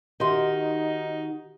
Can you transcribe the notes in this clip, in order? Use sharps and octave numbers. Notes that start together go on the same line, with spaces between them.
D#3 D#4 F#4 G4 C6